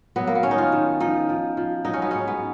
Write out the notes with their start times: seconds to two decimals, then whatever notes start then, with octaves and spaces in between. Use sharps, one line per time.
0.16 F#3 B3
0.27 A#3
0.35 B3
0.43 D#3 C#4
0.51 D#4
0.58 F4
0.72 D#3
1.01 F3 D#4
1.29 F3
1.57 F3
1.85 F#3 D#4
1.93 C#4
2.02 B3
2.11 G#2 C#4
2.28 B3